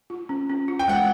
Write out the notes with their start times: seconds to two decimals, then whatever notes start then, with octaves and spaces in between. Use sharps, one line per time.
0.10 F4
0.29 C#4
0.49 C#4
0.68 F4
0.79 G5
0.88 G#3 F#5